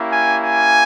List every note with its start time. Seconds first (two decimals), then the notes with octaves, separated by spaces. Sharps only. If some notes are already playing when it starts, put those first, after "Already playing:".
Already playing: A#3 C#4 E4 G4
0.13 G#5
0.43 G#5